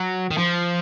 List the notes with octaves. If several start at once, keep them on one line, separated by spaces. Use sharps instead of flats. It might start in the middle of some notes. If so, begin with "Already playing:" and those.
Already playing: F#3
D#3
F3